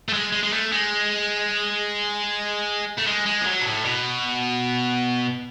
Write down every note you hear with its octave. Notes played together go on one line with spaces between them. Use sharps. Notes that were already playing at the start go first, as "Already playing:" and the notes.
A3
G#3
G#3
G#3
A3
G#3
A3
G#3
G#3
F3
F#3
B2
A2
B2